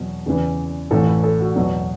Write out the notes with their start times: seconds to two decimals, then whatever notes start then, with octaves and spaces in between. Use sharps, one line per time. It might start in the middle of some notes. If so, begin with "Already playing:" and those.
Already playing: E2 B2 F#3
0.26 E2 C#3 E3
0.91 A1 A2 E3 A4
1.07 B4
1.23 A4
1.40 F#4
1.56 E2 B2 F#3 F#4